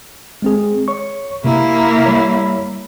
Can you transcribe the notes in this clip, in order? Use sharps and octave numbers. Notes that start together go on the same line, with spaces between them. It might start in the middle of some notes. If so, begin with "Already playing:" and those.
G#3 C4 G#4
C#5 C#6
C3 A#3 E4
G3 C#5 B5